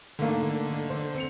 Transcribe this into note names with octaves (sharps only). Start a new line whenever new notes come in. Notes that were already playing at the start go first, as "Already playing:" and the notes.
G#2 D3 A3 A#3
C5
C4 C#7 F7